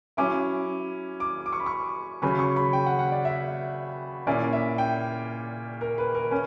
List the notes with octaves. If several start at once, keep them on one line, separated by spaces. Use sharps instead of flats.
F#3 C#4 E4 D6
D6
D6
C#6
B5
C#6
C#3 F#3 C#4 B5
C#6
B5
G5
F#5
F#5
D5
E5
A#2 A#3 C#4 E4 D5
E5
G5
A#4
B4
A#4
C#4